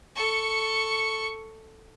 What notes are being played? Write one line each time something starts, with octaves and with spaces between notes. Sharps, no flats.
A4 C#6